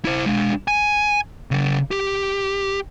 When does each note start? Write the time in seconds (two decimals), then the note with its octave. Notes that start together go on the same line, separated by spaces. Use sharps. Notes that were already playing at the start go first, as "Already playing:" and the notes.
0.05 E4 C5
0.26 G#3 D4
0.68 G#5
1.51 C#3 A#4
1.91 G4